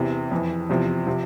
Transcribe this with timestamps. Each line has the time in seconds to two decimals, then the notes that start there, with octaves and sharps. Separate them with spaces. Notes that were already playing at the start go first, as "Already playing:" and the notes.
Already playing: E2 C3 E3
0.31 F2 E3
0.69 E2 C3 F3
1.07 C3 F3